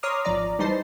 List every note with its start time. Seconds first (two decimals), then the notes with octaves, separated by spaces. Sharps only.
0.03 C#5 A#5 C6 D6 D#6 F6
0.25 G#1 F3 D5 A#5
0.59 E3 G3 D#4 C5 A5 C7